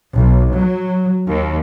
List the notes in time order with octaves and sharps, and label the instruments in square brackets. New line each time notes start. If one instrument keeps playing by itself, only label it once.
[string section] B1
F#3
D#2